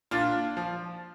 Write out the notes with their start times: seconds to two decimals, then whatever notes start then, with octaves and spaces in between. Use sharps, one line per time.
0.11 A#2 D4 F4
0.57 F3